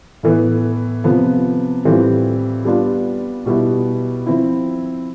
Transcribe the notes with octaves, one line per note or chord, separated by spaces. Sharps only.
A2 E3 B3
C3 F3 B3
A2 E3 G3 C4 F4
G3 B3 D4 F4
B2 G3 B3 E4
F3 C4 E4